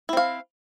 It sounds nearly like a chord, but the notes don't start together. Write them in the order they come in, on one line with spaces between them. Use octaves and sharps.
E4 C4 F5